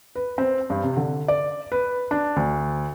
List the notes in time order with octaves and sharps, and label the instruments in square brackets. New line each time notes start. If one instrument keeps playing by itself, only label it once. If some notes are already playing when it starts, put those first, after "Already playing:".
[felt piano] B4
C4
G2
C3
D3
D5
B4
D4
D2